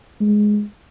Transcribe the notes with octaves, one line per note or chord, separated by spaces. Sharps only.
G#3